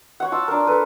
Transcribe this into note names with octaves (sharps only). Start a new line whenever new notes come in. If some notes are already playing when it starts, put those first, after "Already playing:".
C#5 F#5
F4 A5 E6
D4 A#4
A4 B4